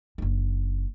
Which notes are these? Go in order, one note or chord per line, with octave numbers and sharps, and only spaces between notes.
F#1 D4